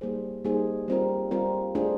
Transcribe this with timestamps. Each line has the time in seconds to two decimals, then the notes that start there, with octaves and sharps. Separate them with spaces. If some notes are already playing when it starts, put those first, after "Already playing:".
0.01 G3 A#3 D#4 G#4 C5
0.44 G3 A#3 D#4 G#4 C5
0.88 G3 C4 F4 A#4
1.31 G3 C4 F4 A#4
1.75 A3 D4 F4 G#4 C5